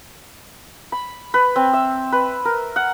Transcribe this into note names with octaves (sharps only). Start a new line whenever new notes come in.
B5
B4
C4
E5
B4
A#4
F#5